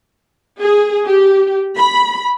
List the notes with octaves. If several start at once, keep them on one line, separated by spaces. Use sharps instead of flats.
G#4
G4
B5